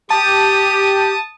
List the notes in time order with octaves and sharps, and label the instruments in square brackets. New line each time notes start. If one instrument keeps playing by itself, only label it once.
[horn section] G4 [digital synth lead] A5 [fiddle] D#6